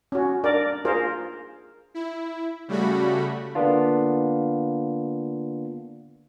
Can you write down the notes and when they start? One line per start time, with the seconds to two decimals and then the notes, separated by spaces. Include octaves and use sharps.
0.12 C#4 F#4
0.44 D4 A#4 D5
0.85 F4 G#4 A#4 C5
1.94 E4
2.68 C#3 G3 A3 F#4 B5
3.55 D3 A#3 B3 D4 F4